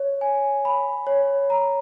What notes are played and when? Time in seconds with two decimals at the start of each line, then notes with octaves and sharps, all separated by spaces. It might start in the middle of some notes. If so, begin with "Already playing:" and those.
Already playing: C#5
0.21 G#5
0.65 B5
1.07 C#5
1.50 A#5